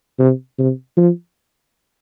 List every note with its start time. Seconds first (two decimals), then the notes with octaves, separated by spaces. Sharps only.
0.19 C3
0.59 C3
0.97 F3